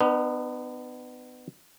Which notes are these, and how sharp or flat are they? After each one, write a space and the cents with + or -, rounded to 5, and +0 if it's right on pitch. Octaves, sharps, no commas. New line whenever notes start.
B3 +25 D#4 -45 B4 -25